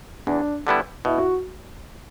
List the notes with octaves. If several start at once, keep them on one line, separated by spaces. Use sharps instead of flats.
E2 D4
D3 G3 B3 E4
B2 E4
F#4